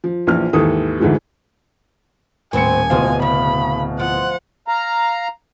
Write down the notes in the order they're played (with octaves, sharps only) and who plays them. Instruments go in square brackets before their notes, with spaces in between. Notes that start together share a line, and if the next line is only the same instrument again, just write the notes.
[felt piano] F3
A#1 A#2 E3 F3 F6
D#2 G#2 E3 A4 D#6
D2 G#2 D3 E3 F3 G#3
[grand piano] D#1 C#7 [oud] A2 B3 C4 [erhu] G#5
[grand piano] D1 B2 F5 [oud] G#3 F4 C5
[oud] C#3 [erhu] B5
[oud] F3 [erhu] F#5
[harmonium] F5 A#5